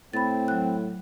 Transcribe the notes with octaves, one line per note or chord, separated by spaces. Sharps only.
A2 C4 B5 A6
F#3 F#6